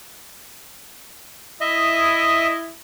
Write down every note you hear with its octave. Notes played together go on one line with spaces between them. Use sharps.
E4 D#5 E5 D#6